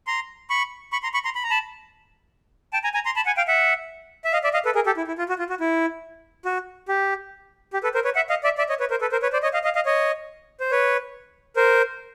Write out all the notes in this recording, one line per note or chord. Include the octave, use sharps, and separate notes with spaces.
A#5 C6
B5 C#6
B5 C#6
A#5 C6
B5 C#6
A#5 C6
B5
A#5
A5 B5
G5 A5
G#5 A#5
G#5 A#5
A#5 C6
A5 B5
F#5 G#5
F5 G5
E5 F#5
E5
D#5 F5
D5 E5
D#5 F5
A4 B4
G#4 A#4
G4 A4
E4
E4
F4
F#4
F4
F#4
E4
F#4
G4
G4
A4 B4
A#4 C5
B4 C#5
E5 F#5
D#5 F5
D5 E5
D5 E5
C#5 D#5
B4 C#5
A#4 C5
A4 B4
A#4 C5
B4 C#5
C5 D5
C#5 D#5
D#5 F5
D#5 F5
D#5 F5
C#5 D#5
C5
B4 C#5
A#4 C5